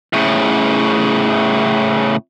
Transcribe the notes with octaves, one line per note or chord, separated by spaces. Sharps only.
A2 C#3